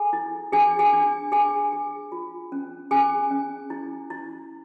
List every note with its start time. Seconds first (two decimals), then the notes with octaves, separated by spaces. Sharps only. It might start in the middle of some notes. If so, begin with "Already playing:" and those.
Already playing: G#4 A4 G#5
0.13 E4
0.53 D4 G#4 G#5
0.79 G#4 G#5
0.93 D4
1.32 D4 G#4 G#5
1.73 G#4
2.12 F4
2.52 C#4
2.91 C#4 G#4 G#5
3.31 C#4
3.70 E4
4.10 E4